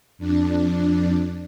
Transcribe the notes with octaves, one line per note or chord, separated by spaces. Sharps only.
F2 D4